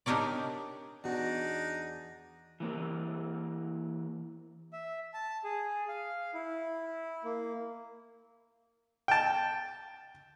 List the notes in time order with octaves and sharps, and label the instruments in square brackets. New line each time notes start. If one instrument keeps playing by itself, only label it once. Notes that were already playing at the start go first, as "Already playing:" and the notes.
[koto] D4 D#4 G4 A#4 C#5 D5
[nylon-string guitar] E2 F#4 [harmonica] D4 D#4
[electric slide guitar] E3 A#3 C4
[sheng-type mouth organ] E5
A5
G#4
F5
E4
A#3
[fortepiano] G5 A5